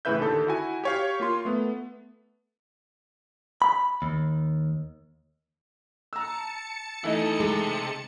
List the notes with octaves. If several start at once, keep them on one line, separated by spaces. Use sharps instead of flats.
A2 C#3 E3 B4 E5 G6
D#2 D3 A4 G6
E4 F#4 G#5
G4 C#5 F5
A#3 F4 C6
A3 B3
B5
D#2
A5 A#5 E6 C#7
E3 A3 D#4 E4 D#5
C3 G#3